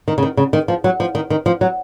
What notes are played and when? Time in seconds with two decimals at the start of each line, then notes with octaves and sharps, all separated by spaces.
0.08 D#3
0.18 C#3
0.23 D#3
0.37 C#3
0.53 D#3
0.68 F3
0.84 F#3
1.00 F3
1.15 D#3
1.30 D#3
1.46 F3
1.61 F#3